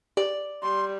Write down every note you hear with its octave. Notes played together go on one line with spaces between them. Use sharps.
G4 D5
G3 C6